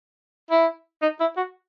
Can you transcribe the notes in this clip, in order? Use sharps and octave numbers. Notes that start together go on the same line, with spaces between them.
E4
D#4
E4
F#4